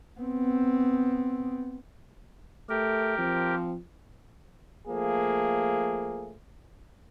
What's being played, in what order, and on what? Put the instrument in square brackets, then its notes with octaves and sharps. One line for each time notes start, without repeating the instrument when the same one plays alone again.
[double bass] B3 C4
[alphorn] A3 [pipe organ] G4 A#4
[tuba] F3 [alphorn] C4
[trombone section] F3 A3 A#3 G#4